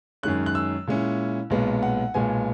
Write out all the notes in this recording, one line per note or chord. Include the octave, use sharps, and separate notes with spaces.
F#2 D#3 G#3 C#4 F#6
F#6
E6
A#2 G#3 C#4 E4
B1 A#2 G#3 B3
F#5
B1 A#2 G#3 B3 G#5